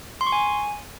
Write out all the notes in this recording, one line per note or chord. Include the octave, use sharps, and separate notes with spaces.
C6
C#6
G#5